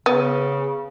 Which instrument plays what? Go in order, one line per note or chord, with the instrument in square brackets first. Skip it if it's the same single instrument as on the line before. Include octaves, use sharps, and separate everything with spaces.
[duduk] C#3 [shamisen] B3